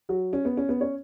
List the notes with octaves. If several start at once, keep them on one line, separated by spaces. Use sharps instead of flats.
F#3 F#4
C#4
B3
C#4
B3
C#4 C#5